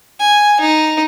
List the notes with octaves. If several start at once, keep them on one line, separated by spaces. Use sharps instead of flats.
G#5
D#4